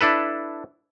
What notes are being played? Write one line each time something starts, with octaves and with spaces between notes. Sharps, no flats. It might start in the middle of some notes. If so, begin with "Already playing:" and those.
D4 E4 A4 B4